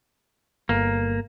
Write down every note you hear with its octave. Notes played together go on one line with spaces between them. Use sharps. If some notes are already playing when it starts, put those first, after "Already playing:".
G1 A#3